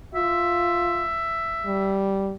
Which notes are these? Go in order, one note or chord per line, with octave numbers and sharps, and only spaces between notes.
F4 E5
G3